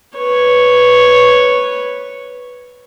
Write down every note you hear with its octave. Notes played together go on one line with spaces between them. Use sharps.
B4 C#5